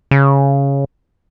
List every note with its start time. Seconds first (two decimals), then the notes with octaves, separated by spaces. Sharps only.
0.11 C#3